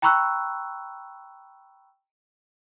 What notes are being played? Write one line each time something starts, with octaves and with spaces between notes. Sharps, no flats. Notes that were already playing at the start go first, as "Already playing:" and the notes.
G5 A#5 B5 C#6 E6 F#6